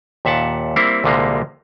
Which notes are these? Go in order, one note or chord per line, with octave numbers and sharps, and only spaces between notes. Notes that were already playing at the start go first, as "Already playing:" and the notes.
D#2 A#2 E5 F#5 A5
G3 A#3 C4 E4
C2 A#2 D3 G3 G#3 A#3